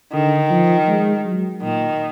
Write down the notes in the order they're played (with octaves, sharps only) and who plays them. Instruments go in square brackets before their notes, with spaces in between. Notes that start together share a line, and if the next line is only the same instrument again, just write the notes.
[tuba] D3 [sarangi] D#3
[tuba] F3
G#3
F#3
[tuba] A#2 [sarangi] D#3